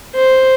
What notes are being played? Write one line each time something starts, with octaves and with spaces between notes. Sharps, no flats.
C5